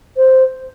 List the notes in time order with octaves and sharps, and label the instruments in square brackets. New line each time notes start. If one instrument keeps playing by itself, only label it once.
[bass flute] C5